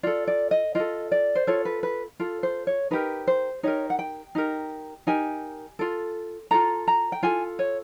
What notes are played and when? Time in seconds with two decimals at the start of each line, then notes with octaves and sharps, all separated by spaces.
0.03 F4 A4 D5
0.28 D5
0.51 D#5
0.75 F4 A4 D#5
1.12 D5
1.35 C5
1.47 F4 A4 C#5
1.65 B4
1.83 B4
2.20 F4 A4
2.43 C5
2.67 C#5
2.91 D#4 G4 A#4 B4
3.27 C5
3.63 D#4 G4 A#4 C#5
3.90 F#5
3.99 G5
4.35 D#4 G4 A#4
5.07 D#4 G4 A#4 G#5
5.79 F4 A4
6.51 F4 A4 A#5
6.88 A#5
7.12 G5
7.23 F4 A4 G#5
7.59 C#5